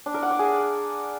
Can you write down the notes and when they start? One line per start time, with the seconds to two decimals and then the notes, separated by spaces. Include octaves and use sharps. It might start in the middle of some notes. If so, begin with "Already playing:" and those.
0.06 D4
0.14 A#4
0.23 F#5
0.31 D5
0.39 G#4